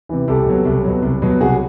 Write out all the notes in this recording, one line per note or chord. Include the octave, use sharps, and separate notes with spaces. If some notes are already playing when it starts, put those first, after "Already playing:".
C3 E3
C2 G4 A4
B2 F#3
C2
B2 F#3
C2
B2 F#3
C2 F#4 G#4